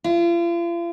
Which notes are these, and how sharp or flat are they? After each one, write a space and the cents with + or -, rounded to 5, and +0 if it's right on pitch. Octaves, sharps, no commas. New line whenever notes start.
F4 -40